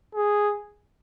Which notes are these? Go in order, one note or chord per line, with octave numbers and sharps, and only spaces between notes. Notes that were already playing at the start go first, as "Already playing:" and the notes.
G#4